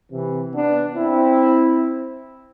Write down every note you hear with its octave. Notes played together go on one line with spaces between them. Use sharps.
C3 E3
B3 D4
C4 E4